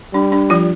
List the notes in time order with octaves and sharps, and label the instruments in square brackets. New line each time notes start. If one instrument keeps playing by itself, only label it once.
[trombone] G3 [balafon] D4
[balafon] D4
F3 F4